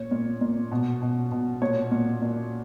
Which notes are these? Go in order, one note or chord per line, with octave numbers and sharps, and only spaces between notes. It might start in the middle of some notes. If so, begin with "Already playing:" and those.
Already playing: A#2 C#5
A#2
A#2
B2
B2
B2
A#2 C#5
A#2
A#2